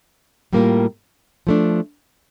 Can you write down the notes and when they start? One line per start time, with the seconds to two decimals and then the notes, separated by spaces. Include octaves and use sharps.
0.53 A2 G3 A#3 F4 A#4
1.47 F3 A3 D4